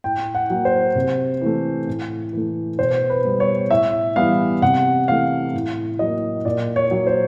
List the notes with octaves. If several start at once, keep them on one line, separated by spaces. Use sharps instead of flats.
A2 G5
F#5
F#3 A#3
C5
C3
E3 A3
A2
E3 A3
B2 C5
B4
G3 B3
C#5
A2 E5
E3 G3 B3 F5
C3 F#5
E3 A3 F5
A2
F#3 A#3 D#5
A#2 D5
C#5
F#3 A#3
C5